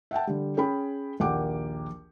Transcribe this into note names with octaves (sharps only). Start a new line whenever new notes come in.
E5 F#5 G5 A5
D3 G3
C#4 G#4 G5 B5
A#1 D#2 A#3 F#5 G5 D6